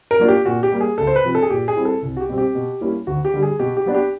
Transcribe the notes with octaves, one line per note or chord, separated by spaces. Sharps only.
A#4
F#3 A#3 D4 F4
G4
A#2 F#4
G4
G3 A#3
G#4
C#2 A4
C5
B4
C3 F3
A4
G#4
A#2 G4
G#4
G3 C4 E4
A4
C2
F#4
G4
B2 G3 C4
G4
B2
G3 A#3 C#4 E4
D2 F#4
G4
D3 G3
G#4
B2 G4
G4
F#3 B3 D4
G4